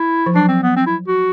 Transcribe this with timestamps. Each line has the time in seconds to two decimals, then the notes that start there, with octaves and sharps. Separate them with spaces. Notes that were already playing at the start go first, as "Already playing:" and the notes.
Already playing: E4
0.26 F3
0.35 F#3 D4
0.49 C4
0.63 B3
0.76 C4
0.87 E4
1.08 F#4